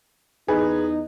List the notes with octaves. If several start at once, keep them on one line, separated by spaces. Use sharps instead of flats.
E2 D#4 G#4 B4